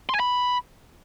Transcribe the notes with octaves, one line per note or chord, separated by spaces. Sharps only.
C6
G#5
B5